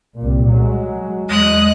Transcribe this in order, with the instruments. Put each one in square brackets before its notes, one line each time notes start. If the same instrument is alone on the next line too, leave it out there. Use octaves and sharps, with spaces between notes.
[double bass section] C2 A#2
F#3 G#3
[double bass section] E2 [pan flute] G#3 [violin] D#6 F#6